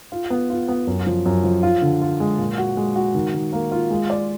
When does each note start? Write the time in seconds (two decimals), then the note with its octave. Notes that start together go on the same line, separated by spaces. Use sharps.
0.12 F4
0.30 B3
0.50 F4
0.68 B3
0.87 F#2
1.06 F3
1.26 F#2
1.44 F3
1.63 F4
1.82 D3
2.01 F4
2.20 G#3
2.39 A#2
2.58 F#4
2.77 G#3
2.96 F#4
3.15 D#3
3.34 D#3
3.53 A#3
3.71 F4
3.90 G#3
4.10 D5